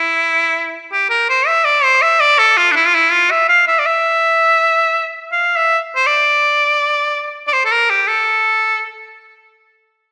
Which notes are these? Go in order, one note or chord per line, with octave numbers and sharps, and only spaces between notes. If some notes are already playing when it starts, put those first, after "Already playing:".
Already playing: E4
G4
A#4
C5
E5
D5
C5
E5
D5
A4
F4
D4
E4
F4
E4
F4
E5
F5
E5
D5
E5
F5
E5
C5
D5
D5
C5
A4
A#4
G4
A4